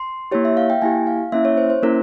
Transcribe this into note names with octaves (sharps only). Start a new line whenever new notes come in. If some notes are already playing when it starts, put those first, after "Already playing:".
Already playing: C6
A#3 E4 G4 C#5
E5
F5
G5
A#3 E4 G4 G#5
F5
A#3 C#4 E4 E5
C#5
C5
C5
A#3 C#4 E4 A#4